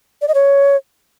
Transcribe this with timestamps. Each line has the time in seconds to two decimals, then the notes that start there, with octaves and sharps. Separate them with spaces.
0.22 D5
0.28 D#5
0.34 C#5